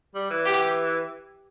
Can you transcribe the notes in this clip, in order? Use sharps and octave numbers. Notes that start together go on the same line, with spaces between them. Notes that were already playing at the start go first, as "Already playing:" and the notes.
G3
E3
G4